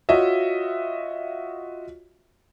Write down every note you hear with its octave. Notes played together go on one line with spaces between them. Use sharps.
F4 F#4 C#5 D#5 E5